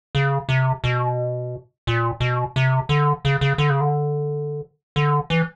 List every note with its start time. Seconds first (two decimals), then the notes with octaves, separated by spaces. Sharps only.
0.15 C#3
0.49 C3
0.84 B2
1.87 A#2
2.20 B2
2.56 C3
2.89 D3
3.25 C#3
3.41 C#3
3.58 D3
3.70 C#3
3.81 D3
4.96 D3
5.30 E3